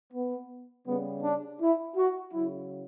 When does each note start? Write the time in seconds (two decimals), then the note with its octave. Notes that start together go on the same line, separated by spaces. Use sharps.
0.12 B3
0.86 C#3 G3 B3
1.22 D4
1.60 E4
1.96 F#4
2.33 C#3 F#3 E4